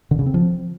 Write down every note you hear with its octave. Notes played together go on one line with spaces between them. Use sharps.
D3
C#3
C4
F3